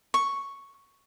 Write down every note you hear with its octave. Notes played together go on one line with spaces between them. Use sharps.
C#6